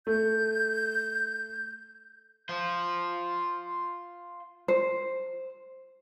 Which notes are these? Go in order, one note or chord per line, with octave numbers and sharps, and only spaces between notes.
A3 G6
F4 C5
C5